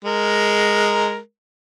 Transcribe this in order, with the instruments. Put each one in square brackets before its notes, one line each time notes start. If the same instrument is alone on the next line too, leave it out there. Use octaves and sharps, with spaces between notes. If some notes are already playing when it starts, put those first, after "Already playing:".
[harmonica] G#3 A#4